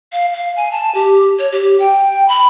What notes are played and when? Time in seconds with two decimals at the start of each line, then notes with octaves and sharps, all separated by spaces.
0.12 F5
0.33 F5
0.56 G#5
0.72 A5
0.95 G4
1.39 C#5
1.52 G4
1.80 G5
2.29 B5